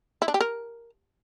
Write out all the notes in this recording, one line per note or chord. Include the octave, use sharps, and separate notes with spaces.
E4
D4
G4
A#4